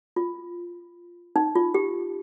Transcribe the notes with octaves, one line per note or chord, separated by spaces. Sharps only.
F4
D#4
F4
G4